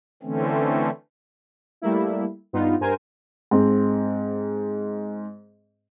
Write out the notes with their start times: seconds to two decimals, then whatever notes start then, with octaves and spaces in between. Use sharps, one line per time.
0.23 D3 E3 A3 C4 C#4
1.82 G3 A3 A#3 E4
2.53 G2 B3 D#4 F4
2.80 G2 A#4 C5 G#5
3.51 G#2 C4